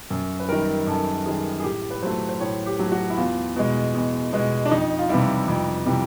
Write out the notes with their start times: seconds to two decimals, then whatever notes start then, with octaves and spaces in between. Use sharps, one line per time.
0.10 F#2
0.40 B4
0.48 D#3 G3 A#4
0.87 F#2 A4
1.26 D#3 G3 G#4
1.60 G#4
1.64 A2 G4
1.91 B4
2.03 F#3 A3 C5
2.29 C5
2.41 A2 C#5
2.66 G4
2.79 F#3 A3
2.92 F#4
3.10 E4
3.17 E2 F4
3.56 B2 G#3
3.94 E2
4.33 B2 G#3
4.65 D4
4.71 F2 D#4
4.99 F4
5.09 C3 E3 G3 E4
5.48 F2
5.86 C3 E3 G3